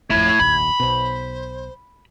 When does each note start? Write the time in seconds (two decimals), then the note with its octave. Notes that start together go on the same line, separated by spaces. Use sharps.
0.10 G#1 F2 A3 E4 G#6
0.40 F1 A#1 D#2 B5
0.80 B1 B2 C5